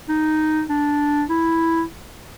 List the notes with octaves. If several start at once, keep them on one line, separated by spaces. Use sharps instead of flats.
D#4
D4
E4